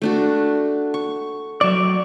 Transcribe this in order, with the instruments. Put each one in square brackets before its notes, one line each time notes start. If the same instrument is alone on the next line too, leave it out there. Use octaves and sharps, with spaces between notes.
[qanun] A3 D4 F#4
C#6
[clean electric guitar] F#3 D5 [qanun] C#6